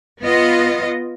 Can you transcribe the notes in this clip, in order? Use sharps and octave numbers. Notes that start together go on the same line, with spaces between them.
B3 F4 D#5